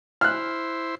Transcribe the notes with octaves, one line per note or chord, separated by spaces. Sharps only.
E4 C5 F6 F#6